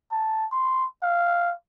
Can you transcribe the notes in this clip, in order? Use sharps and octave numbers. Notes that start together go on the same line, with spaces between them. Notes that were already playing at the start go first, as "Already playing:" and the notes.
A5
C6
F5